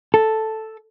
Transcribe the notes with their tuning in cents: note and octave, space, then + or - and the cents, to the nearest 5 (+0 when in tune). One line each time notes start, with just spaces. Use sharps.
A4 +0